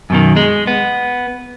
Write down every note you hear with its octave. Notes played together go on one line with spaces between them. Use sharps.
F#2 B2 D#3
G#3
B3